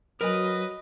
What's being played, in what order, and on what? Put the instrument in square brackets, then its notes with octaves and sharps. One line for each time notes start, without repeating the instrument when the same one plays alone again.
[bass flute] F#3 [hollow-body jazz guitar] A#4 G#5 [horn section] B4 [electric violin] D#5